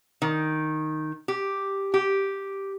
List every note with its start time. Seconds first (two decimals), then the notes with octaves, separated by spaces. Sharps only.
0.22 D#3
1.28 G4
1.94 G4